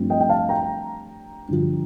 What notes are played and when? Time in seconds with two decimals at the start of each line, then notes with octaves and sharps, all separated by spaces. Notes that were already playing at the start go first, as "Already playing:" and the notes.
Already playing: G2 F3 A3 C4
0.10 D#5 G5
0.21 G5
0.29 F5 A5
0.49 G5 A#5
1.48 G2 D3 F3